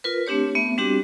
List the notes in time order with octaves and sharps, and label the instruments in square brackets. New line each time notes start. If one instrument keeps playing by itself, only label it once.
[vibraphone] F4 A#4 B4
A3 C4 D4 G4 C#5
A3 B3 E5
G3 C4 D4 F#4 G4